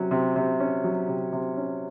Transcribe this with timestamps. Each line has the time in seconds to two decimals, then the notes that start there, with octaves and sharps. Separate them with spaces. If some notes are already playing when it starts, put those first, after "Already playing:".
Already playing: C3 F#3 C#4
0.11 C3
0.36 C3
0.60 C#4
0.84 F#3
1.08 C3
1.32 C3
1.57 C#4